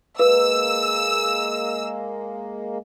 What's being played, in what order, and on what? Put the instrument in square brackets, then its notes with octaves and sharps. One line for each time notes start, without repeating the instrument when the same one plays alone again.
[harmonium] G#3 A#3 [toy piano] B4 [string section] E6